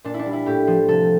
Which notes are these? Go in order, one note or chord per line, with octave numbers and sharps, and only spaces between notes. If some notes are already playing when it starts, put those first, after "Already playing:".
A#2 D4
E4
D4
G3
E4
A2 G4
F3
C3 A4